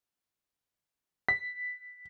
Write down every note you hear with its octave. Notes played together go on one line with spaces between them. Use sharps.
B6